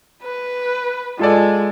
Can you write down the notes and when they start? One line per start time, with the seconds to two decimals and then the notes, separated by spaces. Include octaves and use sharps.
0.22 B4
1.19 G#3 F4 A4 D5